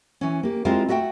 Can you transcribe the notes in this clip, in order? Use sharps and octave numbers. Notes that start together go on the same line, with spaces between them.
E3 C#4
A#3 G4
G#3 C4 E4 F4 G4 A#4
A3 F#4 E5 F5 G5